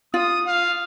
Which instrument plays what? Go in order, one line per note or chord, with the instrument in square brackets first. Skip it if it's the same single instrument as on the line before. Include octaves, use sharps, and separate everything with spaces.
[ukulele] F4 [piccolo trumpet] D#6
[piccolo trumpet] F5